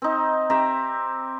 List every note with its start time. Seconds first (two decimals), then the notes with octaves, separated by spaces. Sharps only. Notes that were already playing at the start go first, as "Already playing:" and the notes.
0.02 C4 D#4
0.50 C4 G4 E5 A#5